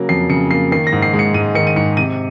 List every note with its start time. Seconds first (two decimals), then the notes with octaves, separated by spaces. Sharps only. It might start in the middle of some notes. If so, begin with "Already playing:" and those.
Already playing: C#3 F#3 A#3
0.09 F2 C7
0.30 C#3 C#7
0.51 A#3 C7
0.71 D#3 C7
0.87 A#6
0.92 G#2
1.02 C7
1.13 G#3
1.19 C#7
1.34 G#2 D#7
1.55 D#3 C#7
1.67 D#7
1.76 G#2 C#7
1.97 C3 D#7